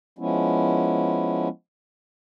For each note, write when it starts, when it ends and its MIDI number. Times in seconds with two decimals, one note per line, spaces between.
0.19 1.48 53
0.19 1.48 56
0.19 1.48 59
0.19 1.48 61
0.19 1.48 64